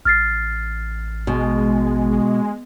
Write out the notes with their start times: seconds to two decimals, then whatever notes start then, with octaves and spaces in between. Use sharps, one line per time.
0.05 A1 F6 A6 C7
1.27 B2 G#3